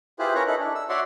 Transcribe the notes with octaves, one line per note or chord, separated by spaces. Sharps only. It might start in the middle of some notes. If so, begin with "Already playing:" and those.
E4 F4 G4 G#4 B4 C5
C#4 A#4 B4 C#5 A#5
D#4 E4 A4 B4
D4
E6
F#4 C#5 D5 E5 F#5 C6